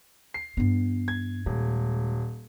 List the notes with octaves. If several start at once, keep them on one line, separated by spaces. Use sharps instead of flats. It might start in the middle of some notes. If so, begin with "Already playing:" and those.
C7
G2 B3
G#6
D#1 G#3